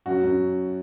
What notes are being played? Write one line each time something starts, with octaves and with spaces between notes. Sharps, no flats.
F#2 F#4
F#2